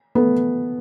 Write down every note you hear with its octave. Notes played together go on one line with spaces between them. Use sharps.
A3 B3